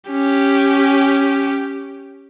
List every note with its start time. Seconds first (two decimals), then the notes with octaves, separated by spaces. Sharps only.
0.11 C#4 G4